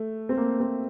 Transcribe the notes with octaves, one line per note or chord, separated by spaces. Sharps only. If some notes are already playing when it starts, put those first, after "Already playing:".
Already playing: A3
C4
A#3
C4